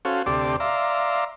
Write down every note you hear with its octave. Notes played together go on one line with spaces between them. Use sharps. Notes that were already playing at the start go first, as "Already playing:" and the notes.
C#4 F#4 A4 C5 F5
D2 C3 G4 A4 D5 C6
D5 E5 F5 A#5 C6